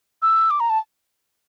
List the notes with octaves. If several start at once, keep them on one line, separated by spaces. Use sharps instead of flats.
E6
D6
A#5
A5